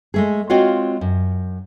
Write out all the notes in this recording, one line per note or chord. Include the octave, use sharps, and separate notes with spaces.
G#3 A3 G#4
G#3 C4 F4 F#4 C#5 F5
F#2